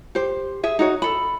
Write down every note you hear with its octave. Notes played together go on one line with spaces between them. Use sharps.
G4 C5
G#4 E5
D#4 F#4 C#5
A4 B5